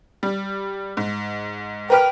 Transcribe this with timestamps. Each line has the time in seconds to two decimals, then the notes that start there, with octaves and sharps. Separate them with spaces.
0.23 G3
0.97 G#2
1.90 A#4 B4 G5 F6